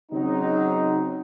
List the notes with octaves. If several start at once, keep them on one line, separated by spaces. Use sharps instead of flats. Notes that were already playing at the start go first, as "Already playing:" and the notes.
C#3 F#3 C4 D#4